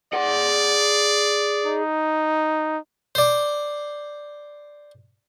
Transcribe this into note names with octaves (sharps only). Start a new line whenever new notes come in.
G#4 D5 F#5
D#4
C5 D5